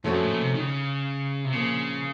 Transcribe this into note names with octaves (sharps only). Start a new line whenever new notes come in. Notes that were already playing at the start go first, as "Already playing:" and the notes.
F2 F3 A3 C#4 F#4
F#2
A2
A#2
C3
D#3
C#3
C3
A#2 C#3 F3 A#3